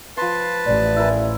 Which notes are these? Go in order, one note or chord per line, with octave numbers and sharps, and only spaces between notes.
F3 B4 A5 C6
A1 D5
E4 A#4 G#5